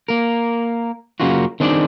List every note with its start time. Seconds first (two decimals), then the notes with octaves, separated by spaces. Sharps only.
0.08 A#3 A#4
1.20 F#2 C#3 A#3 C#4 F4 F#4
1.60 D#3 C4 D4 G#4 D5